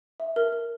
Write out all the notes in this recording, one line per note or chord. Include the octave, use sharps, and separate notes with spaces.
E5
A#4
A#4